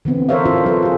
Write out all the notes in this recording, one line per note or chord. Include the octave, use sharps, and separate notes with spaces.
D3 E3 B3 C4
A4 A#4 C5 C#5 E5 F5
D4 E4 F4 A4 C5
F#3 A4 B4
F4 G#4